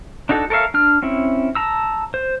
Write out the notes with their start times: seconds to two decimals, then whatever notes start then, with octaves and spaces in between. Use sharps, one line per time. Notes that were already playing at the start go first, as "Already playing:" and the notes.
0.29 D4 D#4 F#4 A4
0.50 A4 A#4 C#5 E5 F5
0.74 D4 F6
1.02 C4 C#4 E4
1.55 A5 A#5 E6
2.14 C5